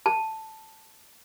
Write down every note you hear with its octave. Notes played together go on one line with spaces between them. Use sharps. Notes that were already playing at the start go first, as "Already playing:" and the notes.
A5